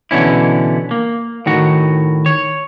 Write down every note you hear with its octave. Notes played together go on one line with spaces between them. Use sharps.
B2 D3 E3 C#4 E4
A#3
A2 D#3 F#4
C#5